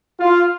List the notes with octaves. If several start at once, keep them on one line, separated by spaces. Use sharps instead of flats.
F4